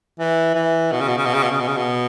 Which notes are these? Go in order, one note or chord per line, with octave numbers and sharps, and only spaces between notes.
E3
E3
B2
C#3
B2
C#3
B2
C#3
B2
C#3
B2
C#3
B2